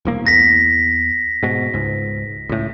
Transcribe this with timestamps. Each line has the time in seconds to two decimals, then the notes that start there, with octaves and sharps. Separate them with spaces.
0.05 E1 C2 A#3
0.27 E2 A#6 B6
1.43 G#2 B2
1.74 C#2 G#2
2.49 C#2 A2